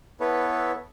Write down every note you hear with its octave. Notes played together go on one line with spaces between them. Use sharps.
B3 E4 A4 B4 C#5